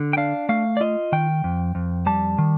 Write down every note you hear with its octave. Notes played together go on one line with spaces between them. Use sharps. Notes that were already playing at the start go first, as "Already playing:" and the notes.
Already playing: D3
G5
D4 F5
A3 F5
D5
F4 D#5
D#3 G5
F2
F2
G3 A5
D#3